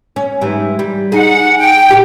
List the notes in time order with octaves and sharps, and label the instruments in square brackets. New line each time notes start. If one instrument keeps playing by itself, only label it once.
[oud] C#4
G#2 E3 G3
G3
[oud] D#4 G#4 [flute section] F#5
[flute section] G5
[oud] A#2 G3 G4